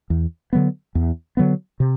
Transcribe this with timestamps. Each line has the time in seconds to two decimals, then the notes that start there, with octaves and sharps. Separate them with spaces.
0.10 E2
0.53 D3 F#3 B3
0.95 E2
1.37 D3 F#3 B3
1.80 C3